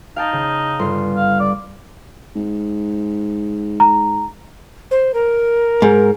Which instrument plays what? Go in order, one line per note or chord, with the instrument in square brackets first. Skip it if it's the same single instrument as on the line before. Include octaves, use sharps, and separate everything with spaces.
[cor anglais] D#4 [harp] F5 G5 A5
[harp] C#3
G1 C6
[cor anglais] F5
D5
[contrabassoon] G#2
[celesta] A#5
[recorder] C5
A#4
[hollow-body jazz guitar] G#2